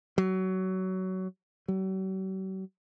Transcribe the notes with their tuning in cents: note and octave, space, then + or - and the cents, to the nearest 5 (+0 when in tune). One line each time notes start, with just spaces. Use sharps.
F#3 +20
F#3 +45